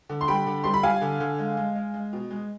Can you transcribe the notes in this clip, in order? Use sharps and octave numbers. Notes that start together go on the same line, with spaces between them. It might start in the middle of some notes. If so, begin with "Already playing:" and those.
D3
C6
G3 G5 B5
D3
G3 C6
B5
G3 F5 G#5
D3
D3
G#3
G#3
G#3
G#3
B2
G#3